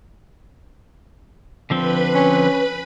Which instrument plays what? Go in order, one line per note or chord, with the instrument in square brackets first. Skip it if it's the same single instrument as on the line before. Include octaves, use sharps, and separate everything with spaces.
[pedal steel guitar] D3 F3 C4 [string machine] B4 B5
[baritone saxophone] C#4